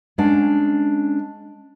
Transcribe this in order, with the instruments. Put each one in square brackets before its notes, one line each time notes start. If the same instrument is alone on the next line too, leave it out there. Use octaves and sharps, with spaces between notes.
[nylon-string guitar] G#3 C#4 D4 F#5